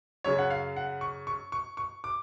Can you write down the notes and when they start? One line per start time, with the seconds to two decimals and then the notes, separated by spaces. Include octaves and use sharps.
0.24 F#2 C#3 C#5
0.38 F#5
0.50 F5
0.76 F#5
1.01 C#6
1.27 C#6
1.52 C#6
1.77 C#6
2.04 D6